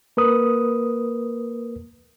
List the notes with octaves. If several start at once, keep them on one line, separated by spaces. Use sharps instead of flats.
A#3 A#4 B4 D#6